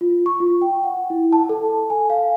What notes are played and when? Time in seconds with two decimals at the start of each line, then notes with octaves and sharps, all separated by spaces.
0.01 F4
0.26 C#6
0.40 F4
0.62 G5
0.84 F#5
1.10 E4
1.32 A5
1.49 A4
1.90 G#5
2.10 F5